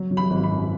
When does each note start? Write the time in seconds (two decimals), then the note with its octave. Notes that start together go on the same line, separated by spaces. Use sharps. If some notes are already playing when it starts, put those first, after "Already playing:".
Already playing: F#3
0.11 F#3
0.17 B5
0.30 G#1
0.43 B5
0.50 F#2